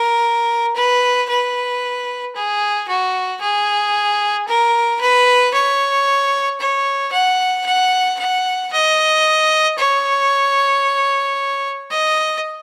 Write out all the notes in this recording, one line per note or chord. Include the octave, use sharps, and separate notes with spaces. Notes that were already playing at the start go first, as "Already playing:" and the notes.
Already playing: A#4
B4
B4
G#4
F#4
G#4
A#4
B4
C#5
C#5
F#5
F#5
F#5
D#5
C#5
D#5